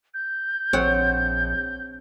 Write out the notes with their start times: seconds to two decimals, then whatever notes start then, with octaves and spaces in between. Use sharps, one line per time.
0.14 G6
0.73 A#1 C4 C#5 F#5